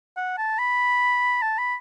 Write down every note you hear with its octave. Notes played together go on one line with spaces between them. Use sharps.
F#5
A5
B5
A5
B5